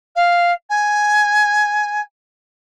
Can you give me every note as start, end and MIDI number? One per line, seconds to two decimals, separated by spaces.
0.16 0.52 77
0.69 2.01 80